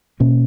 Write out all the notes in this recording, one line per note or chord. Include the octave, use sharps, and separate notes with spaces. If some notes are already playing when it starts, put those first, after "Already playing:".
B2 A#3 C#4